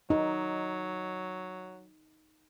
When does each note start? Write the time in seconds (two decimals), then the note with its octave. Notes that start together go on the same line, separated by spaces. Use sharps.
0.10 F#3 D#4